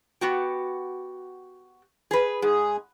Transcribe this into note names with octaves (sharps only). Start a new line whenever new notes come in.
B3 F#4 G4
G#4 B4
G#2 G#4